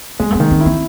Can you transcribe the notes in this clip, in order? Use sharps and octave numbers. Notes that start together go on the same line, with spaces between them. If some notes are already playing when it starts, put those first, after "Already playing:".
G#3 C4
A3
D#3 C4
C4
E4
C4